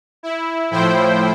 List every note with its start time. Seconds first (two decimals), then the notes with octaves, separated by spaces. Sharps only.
0.23 E4
0.71 A2 F3 E4 C5 G5